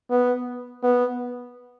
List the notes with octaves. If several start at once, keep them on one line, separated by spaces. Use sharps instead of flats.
B3
B3